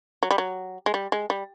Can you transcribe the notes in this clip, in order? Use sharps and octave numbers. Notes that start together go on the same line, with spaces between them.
F#3
G3
F#3
G#3
G3
G#3
G3